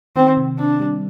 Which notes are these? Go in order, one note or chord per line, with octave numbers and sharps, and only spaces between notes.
D#3 C4
C3
C4 D4
G3